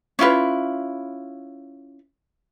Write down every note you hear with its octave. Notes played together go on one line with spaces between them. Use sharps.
C#4 E4 F4 B4